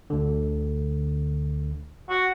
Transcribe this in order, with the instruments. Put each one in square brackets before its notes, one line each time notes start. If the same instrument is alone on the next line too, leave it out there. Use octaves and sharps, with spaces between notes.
[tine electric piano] D2 D3
[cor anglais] F#4